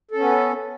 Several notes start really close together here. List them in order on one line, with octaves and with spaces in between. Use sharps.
A4 C#4 B3